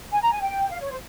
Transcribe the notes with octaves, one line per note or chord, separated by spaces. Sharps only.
G#5
A#5
G#5
G5
F5
C#5
C5